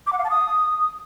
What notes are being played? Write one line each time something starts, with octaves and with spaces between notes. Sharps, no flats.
D6
F#5
F5
A5
D#6